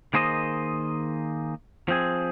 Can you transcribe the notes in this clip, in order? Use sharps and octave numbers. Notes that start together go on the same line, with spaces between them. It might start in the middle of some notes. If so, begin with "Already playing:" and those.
D#3 A#3 G#4 C5 D#5
F3 C4 G#4